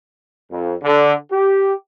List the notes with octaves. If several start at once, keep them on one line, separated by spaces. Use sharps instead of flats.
F2
D3
G4